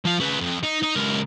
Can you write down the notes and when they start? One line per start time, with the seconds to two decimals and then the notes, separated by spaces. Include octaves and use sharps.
0.05 F3 F5
0.20 C#3 B4
0.40 F2
0.63 D#4
0.82 D#4
0.95 C#2 A#4